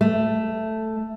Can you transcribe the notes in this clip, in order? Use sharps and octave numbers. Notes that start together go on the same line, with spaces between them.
A3